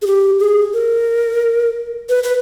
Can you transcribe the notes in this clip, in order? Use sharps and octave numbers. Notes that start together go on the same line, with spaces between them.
G#4
G4
G#4
A#4
B4
B4